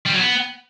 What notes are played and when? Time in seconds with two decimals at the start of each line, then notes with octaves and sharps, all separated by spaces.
0.06 G3
0.13 F#3
0.20 B3